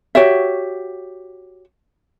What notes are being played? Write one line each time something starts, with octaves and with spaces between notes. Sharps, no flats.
F#4 G4 C#5 E5